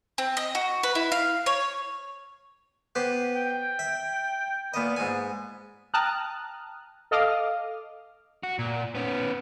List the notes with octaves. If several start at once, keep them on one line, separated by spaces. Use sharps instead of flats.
C4
D#5
F#4
B4
E4
F5
C#5
B3 G4 C5
G5
E5
A#2 B3 D#5
G#2 G#5
G5 A5 A#5 D#6 F6 F#6
A4 D#5 F5 D6 D#6 F6
F#4
A#2
B3 C#4